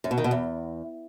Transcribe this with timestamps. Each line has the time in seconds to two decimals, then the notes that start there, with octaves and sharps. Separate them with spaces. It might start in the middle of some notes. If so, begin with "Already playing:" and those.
0.04 F#2
0.11 B2
0.18 D#3
0.24 B2
0.31 E2